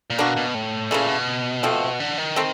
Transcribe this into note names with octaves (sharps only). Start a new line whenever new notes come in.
A#2
B2 A#3 D4 F#4
B2
A2
A#2 C#3 E3 A3
B2
F3 A3 C4
D3
D#3
A3 C4